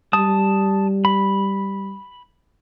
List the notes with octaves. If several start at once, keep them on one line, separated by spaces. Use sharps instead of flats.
G3 A5 D#6
B5